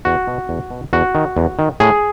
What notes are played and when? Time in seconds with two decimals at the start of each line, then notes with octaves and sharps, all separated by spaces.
0.05 E2 F#4
0.28 B2
0.49 E2
0.71 B2
0.93 E2 F#4
1.15 D#3
1.37 E2
1.59 D#3
1.80 A2 G#4